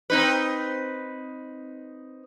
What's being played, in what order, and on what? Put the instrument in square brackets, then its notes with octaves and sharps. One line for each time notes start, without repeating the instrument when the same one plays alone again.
[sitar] C4 D#4 B4